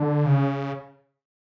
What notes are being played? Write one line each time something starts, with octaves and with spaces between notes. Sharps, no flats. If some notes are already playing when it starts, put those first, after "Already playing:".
Already playing: D3
C#3